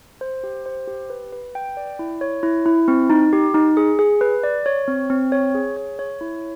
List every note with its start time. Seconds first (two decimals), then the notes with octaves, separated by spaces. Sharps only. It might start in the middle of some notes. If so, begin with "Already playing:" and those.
0.21 C5
0.44 G4
0.66 C5
0.88 G4
1.10 B4
1.32 B4
1.55 G5
1.77 D5
1.99 E4
2.21 C#5
2.43 E4
2.66 E4
2.88 C4
3.10 D#4
3.33 G4
3.54 D#4
3.77 G#4
3.99 G#4
4.21 B4
4.43 D5
4.66 C#5
4.88 C4
5.10 C4
5.32 C#5
5.55 G#4
5.77 C#5
5.99 C#5
6.21 E4